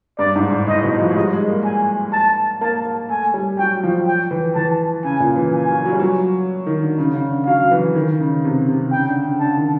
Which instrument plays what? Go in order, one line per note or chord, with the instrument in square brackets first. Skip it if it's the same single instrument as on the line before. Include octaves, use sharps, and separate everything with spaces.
[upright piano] G2 [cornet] D5
[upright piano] G#2
A2
[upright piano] A2 [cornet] D#5
[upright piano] B2
F3
G#3
[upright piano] G3 [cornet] D#5
[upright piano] G#3
A#3
[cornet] G#5
A5
[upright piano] A#3 [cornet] A5
[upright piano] A#3
[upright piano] A3 [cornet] G#5
[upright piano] G3
[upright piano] F#3 [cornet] G5
[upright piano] F3
[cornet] G5
[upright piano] E3
[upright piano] E3 [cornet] A5
[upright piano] C#3 [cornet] G#5
[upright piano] A#2
E3
[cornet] G#5
[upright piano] F#3
F#3
G3
F#3
D#3
D3
C#3
C#3
D3
[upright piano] F#3 [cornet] F5
[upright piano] E3
D#3
C#3
C3
C3
[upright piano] C#3 [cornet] G5
[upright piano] D3
C#3
[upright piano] D3 [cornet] A5
[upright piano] D#3